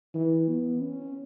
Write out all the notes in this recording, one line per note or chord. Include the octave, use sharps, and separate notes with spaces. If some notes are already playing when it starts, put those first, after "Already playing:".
E3
B3
C#4